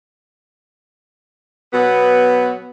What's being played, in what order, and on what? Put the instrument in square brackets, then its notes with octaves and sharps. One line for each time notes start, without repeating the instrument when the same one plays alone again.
[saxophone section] B2 F#3 B3